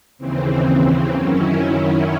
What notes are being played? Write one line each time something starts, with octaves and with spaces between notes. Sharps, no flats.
D#2 C#3 E3 C4
F#2 D#3 F#3 C#4 E4